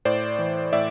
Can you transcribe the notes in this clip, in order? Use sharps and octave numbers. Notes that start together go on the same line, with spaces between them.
A2 C5 D5
E3
A2 D5 E5